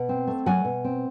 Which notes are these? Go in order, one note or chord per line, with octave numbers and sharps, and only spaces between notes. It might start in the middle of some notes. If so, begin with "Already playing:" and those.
Already playing: B2 F#5
C4
A3
F#3 F#5 G#5
B2
C4